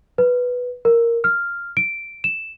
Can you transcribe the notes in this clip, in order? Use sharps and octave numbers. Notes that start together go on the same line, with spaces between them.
B4
A#4
F6
D7
E7